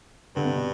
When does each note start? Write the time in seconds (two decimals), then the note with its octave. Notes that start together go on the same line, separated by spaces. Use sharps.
0.36 G2 D3
0.45 C3
0.55 B2